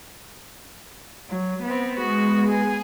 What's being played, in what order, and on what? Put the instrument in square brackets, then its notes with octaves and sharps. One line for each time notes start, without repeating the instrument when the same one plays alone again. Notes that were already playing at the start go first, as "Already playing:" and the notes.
[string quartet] F#3
B3 C4
[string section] G#3 B3 [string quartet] F#4
[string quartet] G#4